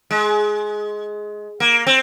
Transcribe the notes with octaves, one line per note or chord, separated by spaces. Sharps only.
G#3
A#3
C4